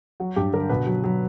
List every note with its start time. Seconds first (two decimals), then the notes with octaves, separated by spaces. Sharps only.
0.20 F#3 F#4
0.36 G2 G4
0.53 D3 A#4
0.69 B2 B4
0.87 F#3
1.04 F#3